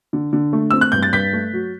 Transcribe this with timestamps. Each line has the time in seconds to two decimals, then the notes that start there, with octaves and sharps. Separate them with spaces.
0.13 D3
0.33 D3
0.53 A3
0.71 C4 E6
0.81 F#6
0.92 G2 G6
1.03 A6
1.13 G2 G6 B6
1.33 A3
1.53 F#3